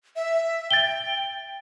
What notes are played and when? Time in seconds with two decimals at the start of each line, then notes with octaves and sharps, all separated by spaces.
0.16 E5
0.71 G5 A6 G7